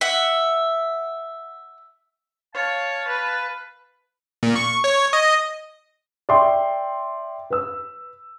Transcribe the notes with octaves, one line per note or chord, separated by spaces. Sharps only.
E5 F#5
C#5 F5 A5
B4
A#2
C#6
C#5
D#5
D5 E5 G5 C6
B4 E6